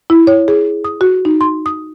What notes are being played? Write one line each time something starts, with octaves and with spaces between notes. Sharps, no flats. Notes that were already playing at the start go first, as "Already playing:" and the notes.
E4
C#5
G#4
D#6
F#4
D#4
C6
D#6